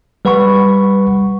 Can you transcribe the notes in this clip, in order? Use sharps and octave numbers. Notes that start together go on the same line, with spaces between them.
G3 B4 F#5 B5 C#6